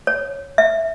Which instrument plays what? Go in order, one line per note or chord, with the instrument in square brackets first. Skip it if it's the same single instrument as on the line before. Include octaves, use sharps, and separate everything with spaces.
[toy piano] C#5
E5